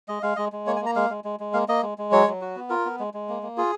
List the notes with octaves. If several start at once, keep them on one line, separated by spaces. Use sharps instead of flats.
G#3 D#5
G#3 F5
G#3 D#5
G#3
A#3 C#5
G#5
A#3 A#5
G#3 F5
G#3
G#3
G#3
A#3 F5
A#3 D#5
G#3
G#3
F#3 C#5
F#3
F#4
B3
F4 A#4
B3
G#3
G#3
A#3
A#3
F4 G#4